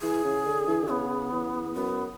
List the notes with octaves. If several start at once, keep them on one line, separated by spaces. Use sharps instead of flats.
E3 G#4
C#3
D3
E3
D3
C#3 B3
E2
F#2 B3